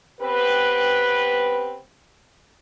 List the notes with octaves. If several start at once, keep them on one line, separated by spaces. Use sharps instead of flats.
B3 C4 G4 B4